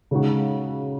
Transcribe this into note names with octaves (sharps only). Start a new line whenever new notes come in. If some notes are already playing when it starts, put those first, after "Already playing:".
C#3 G#3 D#4 F#4